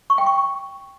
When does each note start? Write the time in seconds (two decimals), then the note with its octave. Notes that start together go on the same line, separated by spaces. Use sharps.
0.10 C#6
0.18 G5
0.27 C#6